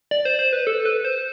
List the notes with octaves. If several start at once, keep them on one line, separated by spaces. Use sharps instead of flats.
D5
C5
C5
B4
A4
B4
C5